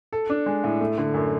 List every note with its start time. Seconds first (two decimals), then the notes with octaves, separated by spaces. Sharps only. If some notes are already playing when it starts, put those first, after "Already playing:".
0.13 A4
0.30 D4
0.46 G#3
0.64 A2
0.81 A3
0.98 D3
1.14 F#2